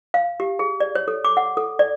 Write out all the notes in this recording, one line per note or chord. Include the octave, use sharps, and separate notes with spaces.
F5
G4
G#4
D5
C#5
A4
D6
F#5
A4
D5